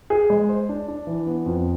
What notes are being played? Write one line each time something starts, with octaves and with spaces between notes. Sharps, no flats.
G#4
G#3
C5
D4
D4
E3
B3
F2